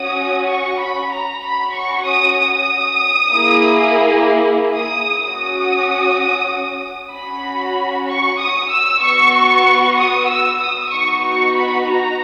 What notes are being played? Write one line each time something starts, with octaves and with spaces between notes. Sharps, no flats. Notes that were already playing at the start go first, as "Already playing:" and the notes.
Already playing: C#4 F#4 D#6
C#6
B5
A#5
C#4 F#4 B5
C#6
D#6
D#6
A#3 E4 G#4
D#6
C#4 F#4 D#6
C#4 F#4 B5
C#6
D#6
E6
B3 F#4 C#6
D#6
E6
D#6
B3 D#4 F#4 C#6
C#6
B5
A#5